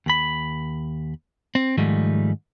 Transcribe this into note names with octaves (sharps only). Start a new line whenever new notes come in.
D#2 B5
C4
G#2 D#3 F3 G3 A3